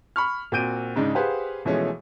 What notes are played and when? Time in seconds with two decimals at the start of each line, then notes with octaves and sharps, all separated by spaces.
0.16 B5 C#6 F6
0.52 A#2 C4 F#4 G6 D7 D#7
0.96 G#2 C#3 G#3 D4 D#4
1.15 G4 G#4 B4 C5 F5 F#5
1.65 B2 E3 F3 G#3 A3 C#4